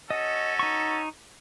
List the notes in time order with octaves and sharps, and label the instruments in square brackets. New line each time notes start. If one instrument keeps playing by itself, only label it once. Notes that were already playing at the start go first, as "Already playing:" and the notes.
[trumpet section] C#4 F#4 A4 [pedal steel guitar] D#5
[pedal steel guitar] D#4 C#6